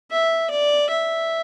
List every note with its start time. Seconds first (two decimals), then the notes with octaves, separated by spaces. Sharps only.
0.11 E5
0.50 D5
0.90 E5